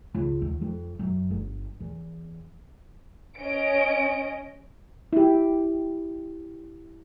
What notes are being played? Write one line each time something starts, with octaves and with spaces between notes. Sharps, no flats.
C#2
D#2
F2
F#2
G1
E2
C#4 D#5 D7
E4 G4